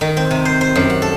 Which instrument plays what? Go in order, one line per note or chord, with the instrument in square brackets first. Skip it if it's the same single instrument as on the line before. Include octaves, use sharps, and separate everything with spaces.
[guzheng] D#3
C4
C3
C5
C5
F#2
F#5
A4